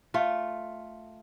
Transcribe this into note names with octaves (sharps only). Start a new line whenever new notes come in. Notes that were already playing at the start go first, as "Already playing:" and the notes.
A3 F4